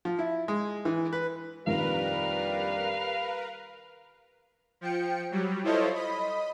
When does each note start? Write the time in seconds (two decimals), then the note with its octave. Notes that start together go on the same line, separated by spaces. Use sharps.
0.05 F3
0.19 E4
0.48 G#3
0.85 E3
1.13 B4
1.67 A#1 F2 D#3 G3 A#4 B4 F5
4.81 F3 G5 C#7
5.31 F#3 G3
5.64 E4 F4 A4 C5 C#5 D#5
5.94 D#5 B5